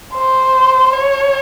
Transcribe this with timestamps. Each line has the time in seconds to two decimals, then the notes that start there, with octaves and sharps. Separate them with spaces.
0.15 C5
0.92 C#5